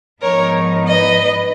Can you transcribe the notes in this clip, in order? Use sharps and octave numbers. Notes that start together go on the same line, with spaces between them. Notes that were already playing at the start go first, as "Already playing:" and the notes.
G#2 F3 B3 D#4 A#4 C#5
B4 D#5